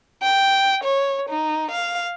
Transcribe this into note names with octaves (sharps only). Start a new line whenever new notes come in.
G5
C#5
D#4
F5